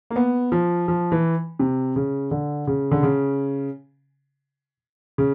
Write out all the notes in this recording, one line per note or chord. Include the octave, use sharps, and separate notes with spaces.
A#3
B3
F3
F3
E3
C3
C#3
D3
C#3
D3
C#3
C#3